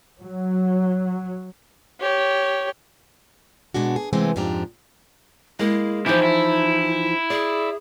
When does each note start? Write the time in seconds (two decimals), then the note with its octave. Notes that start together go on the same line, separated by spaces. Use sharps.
0.18 F#3
2.00 G4 C#5
3.74 B2 G#3 D4 F#4
3.96 G#4
4.13 C3 E3 G#3 A3 B3 C4
4.36 F2 G#2 F3 D4 G4 A#5
5.59 G#3 A#3 E4
6.06 E3 F3 D#4 E4 G4
6.23 E4
7.30 G#4 D5